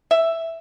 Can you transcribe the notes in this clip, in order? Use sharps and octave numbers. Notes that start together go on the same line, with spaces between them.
E5